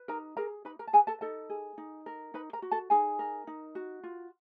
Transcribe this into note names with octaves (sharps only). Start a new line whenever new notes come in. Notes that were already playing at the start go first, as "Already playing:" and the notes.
Already playing: B4
D#4 A#4 A#5
G#4 A#4 A#5
D#4 B4 B5
A#4 A#5
A5
G#4 B4 G#5
A4 A5
D#4 A4 A5
G#4
D#4
A#4
D#4 B4 B5
A#4 A#5
F#4
A4 A5
D#4 G#4 G#5
A#4
D#4
F#4
F4